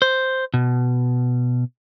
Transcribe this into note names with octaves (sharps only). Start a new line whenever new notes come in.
C5
B2